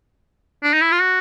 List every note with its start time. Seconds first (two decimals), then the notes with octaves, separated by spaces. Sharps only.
0.63 D4
0.73 D#4
0.82 E4
0.92 F4
1.01 F#4